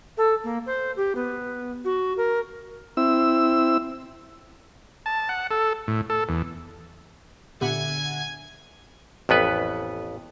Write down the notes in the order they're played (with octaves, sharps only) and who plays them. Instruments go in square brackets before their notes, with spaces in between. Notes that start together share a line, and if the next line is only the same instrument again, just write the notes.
[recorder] A4
A#3
C5
G4
B3
F#4
A#4
[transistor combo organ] C4 E4 E6
A5
F#5
A4
A2
A4
E2
[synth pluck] A#2 B3 G4 [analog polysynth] D3 E5 F#5 [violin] G#5 G#6
[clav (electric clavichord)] A1 F2 B3 B4